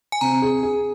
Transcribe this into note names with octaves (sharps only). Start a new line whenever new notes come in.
G#5
C3 A#5
G#4
G#4